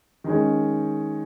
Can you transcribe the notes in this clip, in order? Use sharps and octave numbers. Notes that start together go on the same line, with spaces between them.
D#3 G#3 C#4